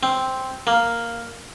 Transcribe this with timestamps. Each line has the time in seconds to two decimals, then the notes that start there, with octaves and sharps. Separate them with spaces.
0.03 C4
0.67 A#3